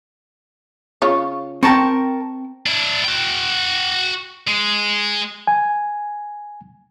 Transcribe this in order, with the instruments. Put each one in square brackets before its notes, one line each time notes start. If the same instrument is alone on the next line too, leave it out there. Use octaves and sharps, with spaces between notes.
[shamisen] C#3 F4 C#5
[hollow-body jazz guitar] C4 G5 [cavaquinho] A#4 A5 C#6
[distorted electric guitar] D4 E4
F#4 G5
G#3
[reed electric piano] G#5